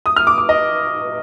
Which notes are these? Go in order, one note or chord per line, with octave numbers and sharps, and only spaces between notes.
D#6
F6
D6
D6
D#5